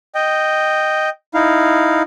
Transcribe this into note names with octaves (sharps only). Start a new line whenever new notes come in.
D#5 G5
D#4 E4 F5